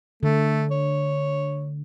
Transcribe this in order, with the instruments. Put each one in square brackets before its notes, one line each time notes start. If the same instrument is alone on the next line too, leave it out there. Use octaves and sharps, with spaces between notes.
[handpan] D3 [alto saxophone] A3
[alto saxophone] C#5